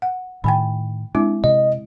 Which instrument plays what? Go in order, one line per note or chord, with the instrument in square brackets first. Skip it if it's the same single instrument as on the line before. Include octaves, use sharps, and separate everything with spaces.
[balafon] F#5
[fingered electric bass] A2 D#3 [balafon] G5 G#5 B5
[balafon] G#3 C4 E4 [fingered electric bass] D4
[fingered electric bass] C3 [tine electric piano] D#5